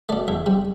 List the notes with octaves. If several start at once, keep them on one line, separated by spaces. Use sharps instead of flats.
B2 A3 D5
E2 E5
C3 G3